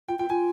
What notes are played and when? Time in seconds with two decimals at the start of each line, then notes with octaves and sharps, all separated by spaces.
0.08 F4 G5
0.19 F4 G5
0.30 F4 G#5